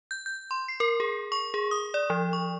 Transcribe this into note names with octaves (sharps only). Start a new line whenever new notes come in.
G6
G6
C6
C7
A#4
G#4
C#6
G#4
D#6
D5
F3
C#6